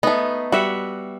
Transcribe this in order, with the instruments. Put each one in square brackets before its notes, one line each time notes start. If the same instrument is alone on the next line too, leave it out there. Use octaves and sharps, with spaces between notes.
[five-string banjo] A3 D#4 [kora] B3
[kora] G3 E5 F#5 [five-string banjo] F#4